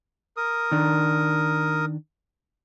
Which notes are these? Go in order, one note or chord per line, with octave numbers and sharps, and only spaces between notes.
A#4 D#6
D#3 D4